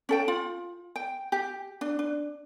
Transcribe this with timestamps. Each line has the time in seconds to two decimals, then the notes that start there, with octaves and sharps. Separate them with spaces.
0.09 C#4 A4 G5
0.28 F4
0.96 G5
1.32 G4
1.81 D4
1.99 D4